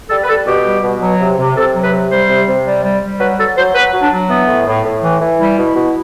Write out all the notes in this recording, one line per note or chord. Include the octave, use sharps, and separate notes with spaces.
G3 A4
B4
G3 A4
B2 G4
G3
B2
F#3
C3
C3
C3 A4
F#3
B4
C3
G3 C5
C3
C3
G3
G3
G3
F#3 B4
F#3 A4
F#3 C5
F#3 B4
F#3
D4
F#3
E3 B3
A2
A2
A2
E3
E3
G3 E4
B2
B2